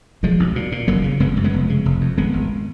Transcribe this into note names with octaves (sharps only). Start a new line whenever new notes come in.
B1 F3 G#3
B1
A#2
A#2
F#1 F#3 A#3
C#3
F#1 G#3 B3
F#2
G#3 B3
F1
C#3
F1
F2
G#1 G#3 B3
G#1